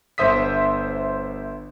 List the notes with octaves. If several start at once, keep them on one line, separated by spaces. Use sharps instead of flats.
G1 C5 E5 D#6 B6